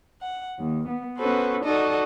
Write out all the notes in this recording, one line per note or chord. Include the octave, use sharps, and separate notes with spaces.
F#5
D#2
B3
B3 C#4 F#4 A4 B4 C5
D#4 F#4 A4 D5 D#5 A5